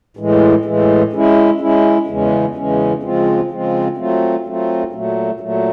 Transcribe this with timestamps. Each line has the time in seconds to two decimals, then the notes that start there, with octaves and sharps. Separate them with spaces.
0.17 A2 E3 G#3
0.65 A2 E3 G#3
1.13 G#3 C#4 E4
1.60 G#3 C#4 E4
2.07 E2 C#3 E3 G#3 C#4
2.55 E2 C#3 E3 G#3 C#4
3.03 C#3 F3 G#3 C4 F4
3.50 C#3 F3 G#3 C4 F4
3.97 F#3 A3 C4 F4
4.45 F#3 A3 C4 F4
4.93 A#2 F#3 A3
5.40 A#2 F#3 A3